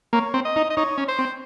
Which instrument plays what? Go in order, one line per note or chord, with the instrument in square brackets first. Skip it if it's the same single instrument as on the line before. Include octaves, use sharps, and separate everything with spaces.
[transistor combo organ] A#3 [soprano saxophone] C#5
[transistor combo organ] C4
[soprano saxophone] D#5
[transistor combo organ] D#4
[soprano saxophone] D#5
[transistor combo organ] D#4 [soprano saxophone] C#5
[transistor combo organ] C#4
[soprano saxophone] C5
[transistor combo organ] C4